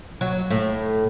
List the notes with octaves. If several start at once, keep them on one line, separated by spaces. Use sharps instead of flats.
F#3
A2